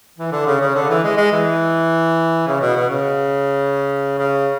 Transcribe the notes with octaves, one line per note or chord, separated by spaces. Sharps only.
E3
D3
C#3
C#3
D3
E3
G#3
G#3
E3
C#3
B2
B2
C#3
C#3